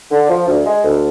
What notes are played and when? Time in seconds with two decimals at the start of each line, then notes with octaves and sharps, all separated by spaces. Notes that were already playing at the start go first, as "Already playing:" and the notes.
0.11 D3
0.29 F3
0.47 D2
0.66 G#3
0.84 D2